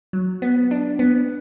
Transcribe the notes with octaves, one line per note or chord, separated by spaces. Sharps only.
F#3
B3
D4
B3